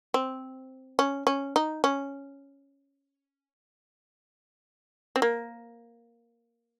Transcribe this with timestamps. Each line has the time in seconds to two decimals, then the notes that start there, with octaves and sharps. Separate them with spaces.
0.14 C4
0.99 C#4
1.27 C#4
1.56 D#4
1.84 C#4
5.16 C4
5.22 A#3